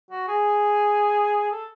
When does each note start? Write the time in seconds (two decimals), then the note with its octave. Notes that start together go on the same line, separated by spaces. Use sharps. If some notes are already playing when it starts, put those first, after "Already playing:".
0.11 F#4
0.28 G#4
1.51 A4